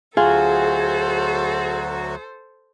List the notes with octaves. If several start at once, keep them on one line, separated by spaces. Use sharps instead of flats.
D2 F#3 F4 F#4 G#4 A4 C5